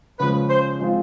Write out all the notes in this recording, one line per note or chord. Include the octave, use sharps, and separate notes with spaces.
C#3 F3 G#3 B4
C5
F3 G#3 C4 F4